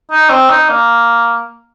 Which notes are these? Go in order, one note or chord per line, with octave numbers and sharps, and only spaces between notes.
D#4
C4
D#4
A#3